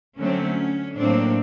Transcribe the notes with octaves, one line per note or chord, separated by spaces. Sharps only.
D3 F#3 A3 C4 C#4
A2 F#3 A#3 C4 D4